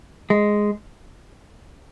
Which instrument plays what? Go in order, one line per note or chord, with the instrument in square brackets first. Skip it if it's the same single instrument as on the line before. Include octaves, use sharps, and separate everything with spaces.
[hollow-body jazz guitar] G#3